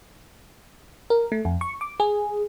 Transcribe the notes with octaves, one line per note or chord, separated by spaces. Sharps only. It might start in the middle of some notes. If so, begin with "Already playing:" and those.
A#4
A3
F2
C#6
D6
G#4